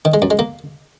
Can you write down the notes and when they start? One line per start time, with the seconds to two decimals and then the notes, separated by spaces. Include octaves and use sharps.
0.05 D#3
0.14 G#3
0.22 F#2
0.30 G#3
0.39 A#3